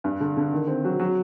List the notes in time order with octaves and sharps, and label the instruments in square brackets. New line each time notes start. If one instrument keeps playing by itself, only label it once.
[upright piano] G2
D3
D3
D#3
C4
F#3
F#3